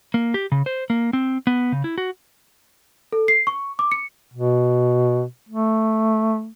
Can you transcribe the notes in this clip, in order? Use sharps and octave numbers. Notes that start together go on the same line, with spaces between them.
A#3
G4
C#3
C5
A#3
C4
B3
C#3
E4
F#4
A4
C7
C#6
D6
C#7
B2
A3